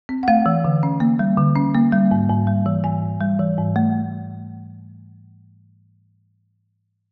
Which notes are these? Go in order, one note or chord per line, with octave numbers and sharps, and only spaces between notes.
C4
F#5
A3 F5
E3
D3
C#4
A#3
G3
D3
C#4
A#3
G3
G#2
G#2
G3
E3
G#2 G#5
G#2
G3
E3
G#2
A3